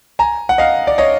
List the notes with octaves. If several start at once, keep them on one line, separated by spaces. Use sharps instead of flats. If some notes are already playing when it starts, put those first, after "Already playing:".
G#5 A#5
F#5
D#5 F5
D5
C#5 D#5